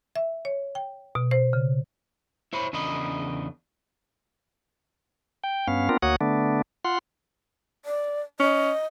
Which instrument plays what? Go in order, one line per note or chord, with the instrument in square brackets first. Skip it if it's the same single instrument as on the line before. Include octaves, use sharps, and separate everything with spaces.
[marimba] E5
C#5
G5
B2
C5
C#3
[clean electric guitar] E4 C5 C#5 B5
E2 C#3 D4 A#4 D#5 B5
[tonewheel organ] G5
G2 B3 C#4 F5
B3 C4 D4 F4 A#4
D2 A#3 F#4 C#5 F#5 D#6
D3 A3 B3 D4
F4 F#5 C6
[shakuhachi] D5
[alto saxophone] C#4 [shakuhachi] D#5